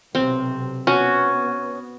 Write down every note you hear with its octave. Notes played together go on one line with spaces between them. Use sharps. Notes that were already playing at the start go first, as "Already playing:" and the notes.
B1 C3 C4
B3 C#4 F#4